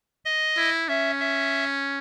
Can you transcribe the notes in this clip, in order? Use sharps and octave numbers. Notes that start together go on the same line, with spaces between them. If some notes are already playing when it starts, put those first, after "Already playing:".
D#5
E4
C#4 E5
E5